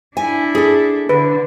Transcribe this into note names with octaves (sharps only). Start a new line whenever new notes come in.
D4 E4 G#5
G#4 A4
D3 B4